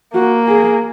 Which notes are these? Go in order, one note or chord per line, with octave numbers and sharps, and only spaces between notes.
A#3 F#4
G#4